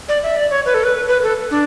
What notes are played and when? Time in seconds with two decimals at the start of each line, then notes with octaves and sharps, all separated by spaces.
0.09 D5
0.23 E5
0.37 D5
0.51 C#5
0.66 B4
0.74 A4
0.84 B4
1.08 B4
1.23 A4
1.51 D4